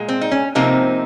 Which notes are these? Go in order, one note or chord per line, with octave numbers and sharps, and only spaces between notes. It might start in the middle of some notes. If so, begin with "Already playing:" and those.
Already playing: A#2 G#3
C4
D#4
C#4
C3 F3 A#3 C4 D#4